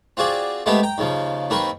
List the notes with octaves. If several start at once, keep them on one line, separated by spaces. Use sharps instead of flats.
C4 F4 F#4 G#4 D5
G#3 A3 B3 C4 G4 B5
G5 A#5
D#2 C#3 F3
D#2 C4 A#4 B4 C#6